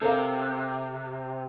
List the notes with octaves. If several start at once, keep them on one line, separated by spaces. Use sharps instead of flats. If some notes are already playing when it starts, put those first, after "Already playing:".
C3 A4 A#4 F5